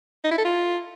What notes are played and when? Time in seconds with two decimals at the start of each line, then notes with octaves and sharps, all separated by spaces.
0.24 D#4
0.31 E4
0.38 A4
0.45 F4